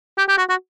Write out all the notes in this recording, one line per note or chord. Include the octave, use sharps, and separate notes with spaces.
G4
G4
F#4
F#4